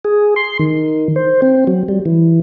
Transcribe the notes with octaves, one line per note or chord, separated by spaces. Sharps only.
G#4
C6
D#3
C5
C4
F#3
G3
E3